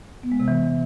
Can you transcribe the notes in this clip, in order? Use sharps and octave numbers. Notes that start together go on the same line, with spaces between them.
B3
G#3
C3
E3